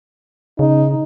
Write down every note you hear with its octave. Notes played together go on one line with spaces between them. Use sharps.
C#3 D#4